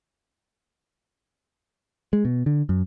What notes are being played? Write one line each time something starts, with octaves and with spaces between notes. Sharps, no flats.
G#3
B2
D3
F#2